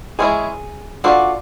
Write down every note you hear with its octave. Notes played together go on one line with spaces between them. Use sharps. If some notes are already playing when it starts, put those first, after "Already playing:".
E3 G#3 C#4 E4 G#4
D4 F4 F#4 A4 D5